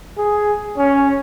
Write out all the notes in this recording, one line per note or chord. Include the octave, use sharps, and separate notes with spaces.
G#4
C#4